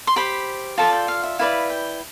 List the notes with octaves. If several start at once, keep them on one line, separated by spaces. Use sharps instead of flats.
C6
G4 C5 B5
F4 A4 D5 A5
G5
F5
E5
E4 B4 D5 F5
G5